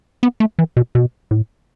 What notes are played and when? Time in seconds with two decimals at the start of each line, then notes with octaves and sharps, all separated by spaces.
0.23 B3
0.40 A3
0.59 E3
0.77 B2
0.95 B2
1.31 A2